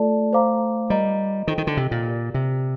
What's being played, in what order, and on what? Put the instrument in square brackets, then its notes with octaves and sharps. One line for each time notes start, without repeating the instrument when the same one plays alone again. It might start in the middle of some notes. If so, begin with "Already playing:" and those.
Already playing: [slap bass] A3 [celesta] F4 A4 D5 A5
[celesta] C5 F5 A#5 D6
[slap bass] G3 [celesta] F4 A#4 D#5 A#5
[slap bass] D#3 [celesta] F4 A4 C5 D#5 G5
[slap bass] D#3
D3
C3
A#2
[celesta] G4 A#4 D5
[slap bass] C3